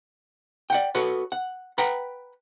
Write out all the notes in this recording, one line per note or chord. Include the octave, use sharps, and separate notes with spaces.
D5 F#5 G5
F#4 A4 B4 C#5
F#5
B4 F#5 G5 A#5 B5